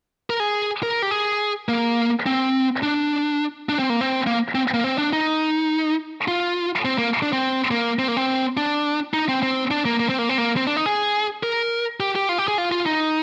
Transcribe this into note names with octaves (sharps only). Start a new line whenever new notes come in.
A#4
G#4
A#4
G4
G#4
A#3
C4
D4
D4
C4
A#3
C4
A#3
C4
A#3
C4
D4
D#4
F4
C4
A#3
D4
C4
A#3
C4
A#3
C4
D4
D#4
C4
C4
D4
A#3
A#3
C4
A#3
C4
A#3
C4
D4
D#4
G#4
A#4
G4
G4
F4
G4
G#4
F4
F4
D#4